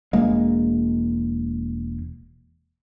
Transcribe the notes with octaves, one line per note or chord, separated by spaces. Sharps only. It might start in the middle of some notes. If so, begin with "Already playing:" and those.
E1 G#3 A#3